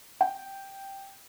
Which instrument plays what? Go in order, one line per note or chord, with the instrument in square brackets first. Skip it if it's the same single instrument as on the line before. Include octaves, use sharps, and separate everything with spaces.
[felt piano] G5